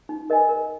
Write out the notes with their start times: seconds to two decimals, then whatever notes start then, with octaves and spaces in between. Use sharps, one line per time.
0.09 D#4
0.30 A#4 D#5 G#5
0.49 A#4